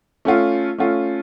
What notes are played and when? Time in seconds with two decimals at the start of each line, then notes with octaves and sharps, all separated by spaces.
0.25 A3 C#4 F4
0.78 A3 C#4 F4